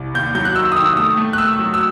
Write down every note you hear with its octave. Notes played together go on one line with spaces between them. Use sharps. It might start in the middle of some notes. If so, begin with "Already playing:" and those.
Already playing: C2
D#2 G6
F#3 G6
F#6
D#3 E6
D#6
D#3 E6
A3 D#6
A3
F#6
A3 E6
F#3
E6